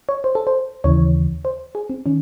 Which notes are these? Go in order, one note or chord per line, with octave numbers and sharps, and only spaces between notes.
C#5
C5
A4
C5
D#2 C#3 E3 C#5
C5
G#4
C4
D#3 C#4